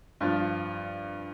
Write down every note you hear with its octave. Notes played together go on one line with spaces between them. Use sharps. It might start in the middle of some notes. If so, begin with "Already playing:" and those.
G2 F3 F4